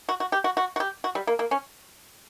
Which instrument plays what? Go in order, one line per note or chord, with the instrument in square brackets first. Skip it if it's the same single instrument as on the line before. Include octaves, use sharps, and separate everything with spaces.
[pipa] F#4
F#4
G4
F#4
F#4
F#4
G4
F#4
G3
A#3
A#3
C#4